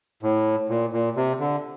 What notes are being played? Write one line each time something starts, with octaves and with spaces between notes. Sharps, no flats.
A2
A#2
A#2
C3
D3